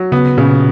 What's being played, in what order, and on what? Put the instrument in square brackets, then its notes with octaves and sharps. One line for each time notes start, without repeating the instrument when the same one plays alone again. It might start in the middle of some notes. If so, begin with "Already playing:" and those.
Already playing: [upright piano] F#3
[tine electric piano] C#3 [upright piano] B3
[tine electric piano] A#2 [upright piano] C#3